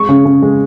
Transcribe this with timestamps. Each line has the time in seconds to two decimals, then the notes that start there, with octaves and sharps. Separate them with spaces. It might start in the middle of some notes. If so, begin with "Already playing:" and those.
Already playing: G#3 C#6
0.09 C#3
0.25 C#3
0.42 G#3